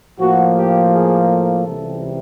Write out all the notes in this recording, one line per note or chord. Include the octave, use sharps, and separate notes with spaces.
A2 F3 A#3 F#4
G4
G#4
A4
C#2 C3 E3 G3